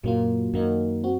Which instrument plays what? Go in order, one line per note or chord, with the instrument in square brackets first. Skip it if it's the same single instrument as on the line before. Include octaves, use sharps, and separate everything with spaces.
[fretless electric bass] F#2 A#2 [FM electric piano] F#3 A#3 F4
[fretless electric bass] F#2 [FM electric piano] D#3 A#3 D#4
[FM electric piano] C4 F#4